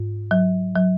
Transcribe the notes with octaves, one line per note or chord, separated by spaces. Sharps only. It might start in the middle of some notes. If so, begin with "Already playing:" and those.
Already playing: G#2
F#3
F#3